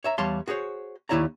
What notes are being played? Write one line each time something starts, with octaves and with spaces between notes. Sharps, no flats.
C#5 E5 A#5
E2 G3 C#5 F5 A5 C6
F#4 G#4 C5 C#5
D#2 D#3 E4 C#5 D5 A#5